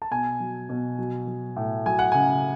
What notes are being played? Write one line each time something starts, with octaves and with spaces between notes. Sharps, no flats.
A5
B2 G#5
F#3
B2
F#3
F#3
A2
F#3 G#5
F#5
C#3 G#5